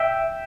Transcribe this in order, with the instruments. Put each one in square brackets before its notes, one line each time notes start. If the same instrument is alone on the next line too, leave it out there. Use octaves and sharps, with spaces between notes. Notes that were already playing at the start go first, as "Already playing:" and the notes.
Already playing: [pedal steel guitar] E5 G5